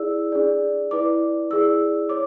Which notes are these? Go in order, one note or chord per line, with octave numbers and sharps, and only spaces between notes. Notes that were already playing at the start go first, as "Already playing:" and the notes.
Already playing: E4 G#4 D5 E6
D4 G#4 D5
E4 B4 D5 D6
E4 G#4 D5 E6
C#5 D6